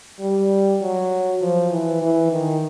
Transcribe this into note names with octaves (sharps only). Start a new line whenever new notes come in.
G3
F#3
F3
E3
E3
D#3